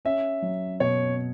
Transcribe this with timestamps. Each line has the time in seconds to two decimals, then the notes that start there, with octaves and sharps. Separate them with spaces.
0.05 C#4 E5
0.42 F#3
0.80 B2 C#5